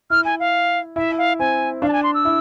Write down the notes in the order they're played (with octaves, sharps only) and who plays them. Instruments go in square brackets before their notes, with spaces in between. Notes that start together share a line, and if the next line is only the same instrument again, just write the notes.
[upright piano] E4 [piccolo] F6
[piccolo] G#5
F5
[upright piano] E4 [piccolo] E5
[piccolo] F5
[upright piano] C4 [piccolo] G#5
[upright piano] D4 [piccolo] F5
[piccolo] A5
G#5
C6
E6
[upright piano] E4